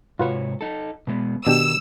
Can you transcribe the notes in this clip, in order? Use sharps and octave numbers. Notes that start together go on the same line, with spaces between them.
G#2 C3 F4 F#4 B4 C#5
D#4 A4
B2 G#3 B3
B2 D#3 D4 G4 E6